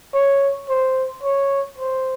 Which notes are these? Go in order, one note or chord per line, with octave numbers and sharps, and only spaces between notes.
C#5
C5
C#5
C5